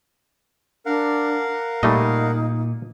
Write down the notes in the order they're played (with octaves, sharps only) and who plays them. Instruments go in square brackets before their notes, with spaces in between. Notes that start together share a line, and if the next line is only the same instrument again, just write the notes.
[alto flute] D4 [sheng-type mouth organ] A#4 F5 F#5
[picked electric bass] A#2 [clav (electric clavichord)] G3 A3 D#5 [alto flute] D#4